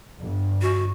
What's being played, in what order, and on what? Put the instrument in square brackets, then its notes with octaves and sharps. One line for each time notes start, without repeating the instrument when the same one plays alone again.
[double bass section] G1
[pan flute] F#4